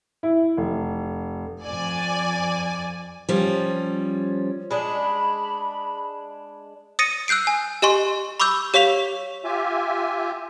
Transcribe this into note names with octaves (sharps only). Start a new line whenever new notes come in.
E4
F1
F2 D5 G#5
F3 G3 C#4
G#3 D4 B5
D#6 A6 A#6 C#7 D#7
E6 F#6 G6 C7 D7
G#5
G4 D#5 G#5 C6 C#6
B5 C#6 D6 E6 G6
G4 C#5 F5 C#6 B6 F7
F4 G4 E5 G#5